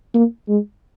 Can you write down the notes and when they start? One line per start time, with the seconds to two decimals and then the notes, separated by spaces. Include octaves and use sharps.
0.14 A#3
0.48 G#3